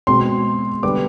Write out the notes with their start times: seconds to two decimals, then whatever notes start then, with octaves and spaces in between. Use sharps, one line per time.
0.07 B2 G#3 C4 C6
0.83 D3 G3 B3 D6